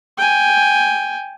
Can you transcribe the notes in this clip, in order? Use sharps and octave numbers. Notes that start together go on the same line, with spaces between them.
G5 G#5